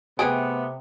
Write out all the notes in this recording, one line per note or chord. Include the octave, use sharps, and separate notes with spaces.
C3 A3 B3 G#4 G5 D#6